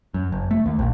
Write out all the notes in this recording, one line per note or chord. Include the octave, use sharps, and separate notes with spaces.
F#2
F#1
A3
D#2
A#1